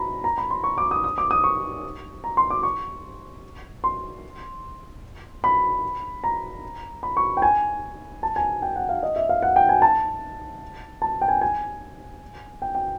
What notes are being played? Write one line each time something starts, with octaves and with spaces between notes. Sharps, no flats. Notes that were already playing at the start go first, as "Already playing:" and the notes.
Already playing: A#5 B5
A#5
B5
C6
C#6
D6
D#6
D#6
D6
D#6
C#6
A#5
C6
D6
C#6
C6
B5
A#5
B5
C#6
G5
G#5
A5
G#5
G5
F#5
F5
D#5
E5
F5
F#5
G5
G#5
A5
A5
G5
G#5
G#5
G5
G5